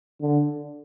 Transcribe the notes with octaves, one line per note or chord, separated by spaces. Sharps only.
D3